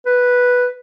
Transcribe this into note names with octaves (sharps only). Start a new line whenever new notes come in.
B4